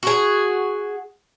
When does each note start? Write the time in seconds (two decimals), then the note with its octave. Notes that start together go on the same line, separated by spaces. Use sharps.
0.03 F#4 G#4